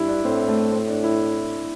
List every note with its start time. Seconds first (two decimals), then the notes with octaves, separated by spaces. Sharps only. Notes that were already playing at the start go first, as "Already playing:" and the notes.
Already playing: G2 E4
0.08 D4
0.25 A2 C4
0.48 A3
0.72 C4
0.88 D4
1.04 E4